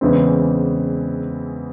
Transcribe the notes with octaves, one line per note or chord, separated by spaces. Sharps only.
E2 C#3 E3 G#3 C4